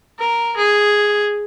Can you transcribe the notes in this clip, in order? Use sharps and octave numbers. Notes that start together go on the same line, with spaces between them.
A#4
G#4